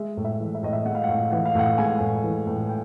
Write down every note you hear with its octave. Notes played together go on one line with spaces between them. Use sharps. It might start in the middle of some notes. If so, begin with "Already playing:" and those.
Already playing: G#3 E5
A2
E5
E3
E5
A2 D#5
E5
G#3 F#5
F5
A2 F#5
E3 F#5
F5
A2 F#5
G#3 G#5
A2
E3
A2
G5